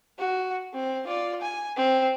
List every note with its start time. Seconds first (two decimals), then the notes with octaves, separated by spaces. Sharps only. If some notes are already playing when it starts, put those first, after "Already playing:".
0.19 F#4
0.74 C4
1.07 F4 D5
1.41 G#5
1.77 C4